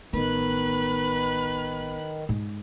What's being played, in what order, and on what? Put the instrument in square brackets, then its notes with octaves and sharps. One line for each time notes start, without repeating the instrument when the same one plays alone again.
[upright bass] A1 B3 [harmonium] D#3 [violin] B4 F#6
[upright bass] G#2